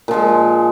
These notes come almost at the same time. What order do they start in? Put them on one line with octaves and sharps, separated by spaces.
A#2 F3 G#3